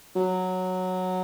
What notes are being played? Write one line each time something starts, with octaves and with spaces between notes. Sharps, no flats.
F#3